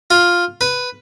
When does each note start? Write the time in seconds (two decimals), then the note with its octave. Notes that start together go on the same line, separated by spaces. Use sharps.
0.11 F4
0.61 B4